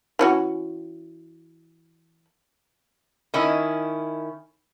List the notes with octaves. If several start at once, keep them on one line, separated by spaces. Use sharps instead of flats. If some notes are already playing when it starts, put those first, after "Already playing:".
E3 C#4 F#4
D#3 C#4 E4